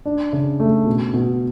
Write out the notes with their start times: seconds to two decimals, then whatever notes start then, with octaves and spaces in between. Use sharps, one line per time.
0.05 D4
0.33 C#3
0.60 A3
0.86 B2
1.14 B2